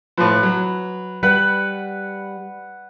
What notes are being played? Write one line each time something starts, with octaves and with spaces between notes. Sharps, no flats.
A2 F3 B4
F#3
G3 B4 F#5